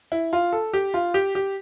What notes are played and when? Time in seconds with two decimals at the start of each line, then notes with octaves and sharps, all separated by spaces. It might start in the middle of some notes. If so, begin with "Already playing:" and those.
0.12 E4
0.33 F4
0.53 A4
0.73 G4
0.94 F4
1.14 G4
1.35 G4